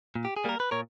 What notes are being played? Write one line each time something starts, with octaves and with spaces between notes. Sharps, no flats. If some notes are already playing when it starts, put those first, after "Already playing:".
A#2
G4
G#4
G3 A#3 A#4
B4
A#2 A#4 C#5